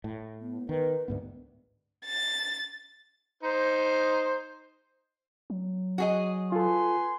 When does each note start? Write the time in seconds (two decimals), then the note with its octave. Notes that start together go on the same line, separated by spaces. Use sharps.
0.04 A2
0.40 B3
0.69 D#3 B4
1.08 D2 G#2 B3
2.06 A6
3.43 D#4 C5
5.50 F#3
5.98 F#4 G#4 D#5
6.52 F4 A4 B4 G#5 C6